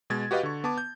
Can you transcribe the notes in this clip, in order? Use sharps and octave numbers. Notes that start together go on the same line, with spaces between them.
B2 G#3 G#6 A6
F#4 G4 B4 D#5 F5 F#5
D3 C#6
B3 A5 D6
G6